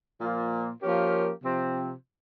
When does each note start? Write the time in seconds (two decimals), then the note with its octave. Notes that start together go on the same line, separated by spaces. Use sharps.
0.20 A#2 F3 A#3 F4
0.82 F3 A#3 C#4 G4 A#4
1.43 C3 F3 C4